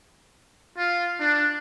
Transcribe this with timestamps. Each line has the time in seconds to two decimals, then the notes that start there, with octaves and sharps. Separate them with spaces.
0.76 F4
1.20 D4